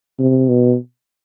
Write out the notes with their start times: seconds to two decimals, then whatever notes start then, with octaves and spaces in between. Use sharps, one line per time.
0.19 C3
0.48 B2